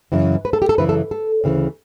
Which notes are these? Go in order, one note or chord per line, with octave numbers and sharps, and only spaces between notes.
F#2 C#3 E3
B4
A4
G4
A4
F#2 C#3 E3 B4
A4
A4
D2 C#3 E3